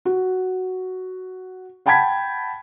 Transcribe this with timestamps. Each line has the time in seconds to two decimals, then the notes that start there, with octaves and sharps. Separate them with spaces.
0.05 F#4
1.86 F#5 G5 A5 B5 G#6 B6